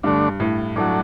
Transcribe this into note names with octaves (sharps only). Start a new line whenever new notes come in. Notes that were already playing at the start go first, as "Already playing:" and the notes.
G2 D3 A3 D4
A2
A2 F#3 A3 D4